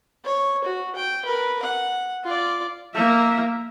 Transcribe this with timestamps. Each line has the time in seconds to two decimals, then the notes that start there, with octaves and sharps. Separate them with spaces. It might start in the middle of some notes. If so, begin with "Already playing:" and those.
0.24 C#5
0.64 F#4
0.96 G5
1.25 A#4 B4
1.63 F#5
2.24 F4 D5
2.95 A#3 E5